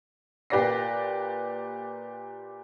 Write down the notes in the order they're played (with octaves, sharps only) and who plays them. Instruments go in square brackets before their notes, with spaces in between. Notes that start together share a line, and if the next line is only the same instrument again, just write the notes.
[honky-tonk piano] A#2 G4 B4 D5 A#6 C7